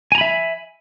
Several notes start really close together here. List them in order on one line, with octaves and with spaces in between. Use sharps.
G#5 A#5 B5 E5